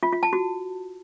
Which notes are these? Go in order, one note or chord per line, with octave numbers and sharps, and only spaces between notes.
F4
F4
A5
F#4